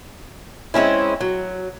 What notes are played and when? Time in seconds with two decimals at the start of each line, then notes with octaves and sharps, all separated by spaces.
0.74 G#3 C4 C#4 E4
1.21 F#3